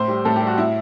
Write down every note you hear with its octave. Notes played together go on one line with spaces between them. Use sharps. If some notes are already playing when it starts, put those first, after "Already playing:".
Already playing: A2 C5
G3
A2 A4
G4
G3
F#4
A2 E4